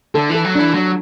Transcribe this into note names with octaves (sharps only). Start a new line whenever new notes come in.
D3 A4
E3 A4
F#3
E3 D4
F#3